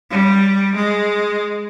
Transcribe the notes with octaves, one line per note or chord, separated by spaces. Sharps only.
G3
G#3